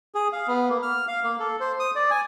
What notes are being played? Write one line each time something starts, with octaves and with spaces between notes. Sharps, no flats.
G#4
F5
B3
A#3
F6
F5
A#3
A4
C5
D#6
D5
G#5